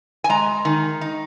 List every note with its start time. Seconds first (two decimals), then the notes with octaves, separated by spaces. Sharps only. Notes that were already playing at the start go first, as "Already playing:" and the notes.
0.24 G#5
0.29 G#3 A#5
0.65 D#3
1.01 D#4